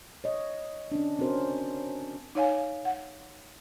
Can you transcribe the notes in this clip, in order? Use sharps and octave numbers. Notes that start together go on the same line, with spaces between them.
C#5 D#5
C#4 D4
C4 C#4 F#4 A#4 C5
D#4 C#5 F5 G#5
F#5